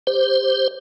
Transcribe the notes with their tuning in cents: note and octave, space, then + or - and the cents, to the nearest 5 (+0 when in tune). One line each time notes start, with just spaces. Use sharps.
G4 +10 C5 +0